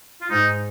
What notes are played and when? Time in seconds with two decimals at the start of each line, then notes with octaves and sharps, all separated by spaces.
0.21 F4
0.30 G#2 D#4